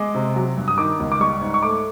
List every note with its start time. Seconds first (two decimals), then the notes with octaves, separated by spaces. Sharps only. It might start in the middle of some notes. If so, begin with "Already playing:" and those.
Already playing: G#3 D6
0.15 C3
0.36 F#3
0.57 G2
0.68 D#6
0.78 D#3 D6
1.00 C#2
1.12 D6
1.20 G3 C#6
1.41 G#2
1.54 C#6
1.63 A3 D6